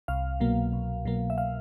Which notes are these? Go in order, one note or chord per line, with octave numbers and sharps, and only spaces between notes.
C2 F5
B2 F#3 A#3
C2
B2 F#3 A#3
E5
F5